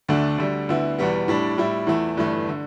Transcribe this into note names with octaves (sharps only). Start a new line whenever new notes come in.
D2 D3 A3 D4
D2 D3 G3
D2 D3 B3 E4
E2 B2 G3 B3
A2 G3 D4
A2 G3 E4
E2 E3 A3 E4
G1 G2 E3 A3
D3